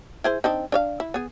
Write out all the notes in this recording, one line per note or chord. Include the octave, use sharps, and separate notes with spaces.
E4 G#4 C5
C4 D4 D#4
D4 C#5 F5
E4
B3 G#4